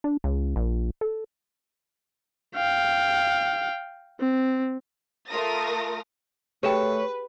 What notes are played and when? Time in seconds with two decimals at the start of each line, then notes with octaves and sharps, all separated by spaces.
0.04 D4
0.24 C#2
0.56 A#1
1.01 A4
2.56 F5 G5
4.20 C4
5.28 A3 F4 A#4 D#6 A#6
6.63 A3 G4 G#4 B4 C#5 G5